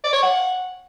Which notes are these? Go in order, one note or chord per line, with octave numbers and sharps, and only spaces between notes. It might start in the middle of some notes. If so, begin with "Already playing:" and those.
D5
C#5
F#5